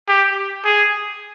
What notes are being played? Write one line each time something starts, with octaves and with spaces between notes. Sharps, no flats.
G4
G#4